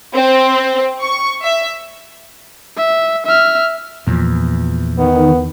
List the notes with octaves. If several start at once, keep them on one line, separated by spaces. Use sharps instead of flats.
C4
C#6
E5
E5
E5 F6
E2 A#2 F3
D#3 B3